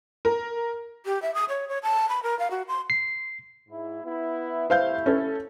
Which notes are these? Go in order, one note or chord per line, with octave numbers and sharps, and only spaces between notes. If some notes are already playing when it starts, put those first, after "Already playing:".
A#4
G4
E5
D#6
C#5
C#5
A5
B5
A#4
F5
F#4
C6
C7
G#2 E4
B3 E4
C3 A3 E4 C5 F5 G6
C#4 A4 C#5